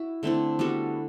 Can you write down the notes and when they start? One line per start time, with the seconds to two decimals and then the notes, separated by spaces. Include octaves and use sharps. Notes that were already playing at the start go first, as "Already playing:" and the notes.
Already playing: E4 F#4
0.23 D3 A3 C4 E4
0.59 G3 B3 F#4 A4